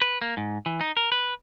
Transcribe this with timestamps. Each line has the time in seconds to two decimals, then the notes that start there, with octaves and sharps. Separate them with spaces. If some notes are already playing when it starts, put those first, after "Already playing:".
0.01 B4
0.22 A#3
0.37 G#2
0.66 E3
0.81 D#4
0.97 A#4
1.12 B4